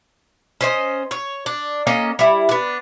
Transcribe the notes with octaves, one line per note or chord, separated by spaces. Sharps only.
C#4 C5 D#5
C#5
D4
A#3 C#4 A4 D#5
G3 E4
B3 D4